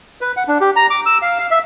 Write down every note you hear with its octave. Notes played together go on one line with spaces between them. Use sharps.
B4
F#5
D4
G4
A#5
D6
E6
F5
F5
E5